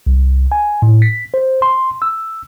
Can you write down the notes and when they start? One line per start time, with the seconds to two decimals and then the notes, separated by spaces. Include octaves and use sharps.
0.07 C2
0.52 G#5
0.82 A2
1.02 B6
1.34 C5
1.62 C6
2.02 E6